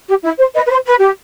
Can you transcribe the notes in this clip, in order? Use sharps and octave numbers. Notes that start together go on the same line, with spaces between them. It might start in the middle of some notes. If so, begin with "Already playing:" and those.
G4
E4
C5
B4 D#5
B4
C5
B4
G4